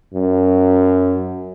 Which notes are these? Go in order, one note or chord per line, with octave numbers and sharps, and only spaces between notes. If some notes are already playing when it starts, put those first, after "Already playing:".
F#2